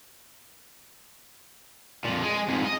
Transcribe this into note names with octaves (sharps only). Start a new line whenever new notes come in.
F2 A#2
G#3 G#4
F2 G#2
D#5